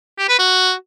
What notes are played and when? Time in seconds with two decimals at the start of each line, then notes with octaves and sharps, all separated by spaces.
0.18 G4
0.29 B4
0.39 F#4